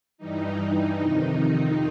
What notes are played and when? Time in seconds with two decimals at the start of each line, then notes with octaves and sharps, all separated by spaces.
0.18 G2 E3 G3 D#4
0.99 F2 C3 D#3